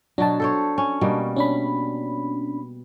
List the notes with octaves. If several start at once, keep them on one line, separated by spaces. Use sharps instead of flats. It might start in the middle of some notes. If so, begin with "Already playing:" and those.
B2 F#3 D4 A5
A4 C5 C#5
C#4
B2 G3 A#3
C#4 D4 B5